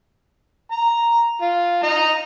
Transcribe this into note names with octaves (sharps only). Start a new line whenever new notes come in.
A#5
F4
D#5 A#5